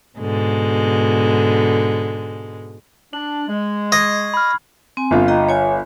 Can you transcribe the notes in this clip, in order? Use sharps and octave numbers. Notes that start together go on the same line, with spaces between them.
G#2 B2 D3 G#3
D4 F#7
G#3
D#5 C#6 G#6 C7
B5 F6
C4 G#5
G1 F4
D#5 G5 A#5
C#5 G#5